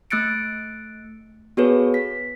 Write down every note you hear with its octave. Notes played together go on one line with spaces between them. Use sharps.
A3 E6 F#6 A6 C#7 D7
B3 F#4 G#4 A4 B4 C#5
B6